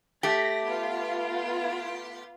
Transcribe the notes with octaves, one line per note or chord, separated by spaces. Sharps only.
A3 G4 A#6
B3 F4